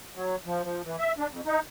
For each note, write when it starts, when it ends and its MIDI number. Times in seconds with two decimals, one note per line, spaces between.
0.15 0.36 54
0.46 0.63 53
0.64 0.82 53
0.85 0.96 52
0.99 1.12 76
1.18 1.27 62
1.30 1.41 41
1.46 1.60 63